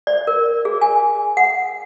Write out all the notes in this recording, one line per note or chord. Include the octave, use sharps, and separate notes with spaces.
D5
A#4
G#4
G#5
F#5